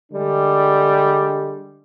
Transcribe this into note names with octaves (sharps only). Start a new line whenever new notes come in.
D3 G3 G#3 D4